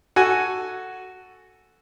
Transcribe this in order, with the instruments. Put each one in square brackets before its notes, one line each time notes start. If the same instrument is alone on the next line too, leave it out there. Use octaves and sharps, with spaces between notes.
[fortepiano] F#4 A4 G#5